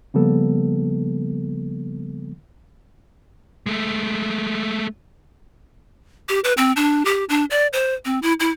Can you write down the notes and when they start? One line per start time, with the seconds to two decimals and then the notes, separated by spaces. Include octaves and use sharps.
0.14 C#3 F3 G3 A#3 B3 A4
3.66 G#3 A3
6.29 G4
6.44 B4
6.57 C4
6.76 D4
7.05 G4
7.29 D4
7.50 D5
7.73 C5
8.05 C4
8.22 E4
8.40 E4